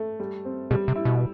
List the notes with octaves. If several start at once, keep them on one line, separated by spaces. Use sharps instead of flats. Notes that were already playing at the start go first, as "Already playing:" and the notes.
Already playing: A3
G3
C4
B2 G3
C3
E4
B2